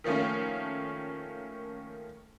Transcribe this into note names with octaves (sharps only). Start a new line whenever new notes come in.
D#3 F3 A3 A#3 C#4